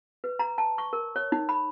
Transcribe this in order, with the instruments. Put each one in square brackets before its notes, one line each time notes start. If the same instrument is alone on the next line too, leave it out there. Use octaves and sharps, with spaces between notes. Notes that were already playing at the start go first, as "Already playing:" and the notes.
[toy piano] B4
A#5
A5
C#6
A#4
C#5
D#4
B5